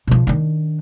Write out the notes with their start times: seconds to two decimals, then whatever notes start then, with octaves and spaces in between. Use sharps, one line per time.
0.07 B2 F3
0.27 D#3 D4